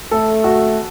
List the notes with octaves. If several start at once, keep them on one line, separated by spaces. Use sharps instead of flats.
A3 A4
F#4